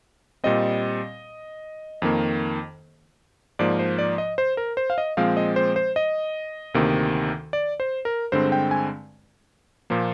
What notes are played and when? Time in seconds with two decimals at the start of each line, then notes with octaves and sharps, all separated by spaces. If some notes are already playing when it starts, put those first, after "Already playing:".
0.44 A#2 G3 C4 D#5
2.02 F2 D#3 A#3
3.59 G#2 F3 A#3 D5
3.79 C5
3.98 D5
4.18 D#5
4.38 C5
4.57 A#4
4.77 C5
4.90 F5
4.98 D#5
5.17 A#2 F3 G#3 C4 F5
5.37 D#5
5.56 C5
5.76 C5
5.96 D#5
6.74 D2 C3 D#3 A#3
7.53 D5
7.80 C5
8.05 A#4
8.32 G2 D3 G#3 C4 C5
8.52 G5
8.71 G#5
9.90 A#2 F3 A#3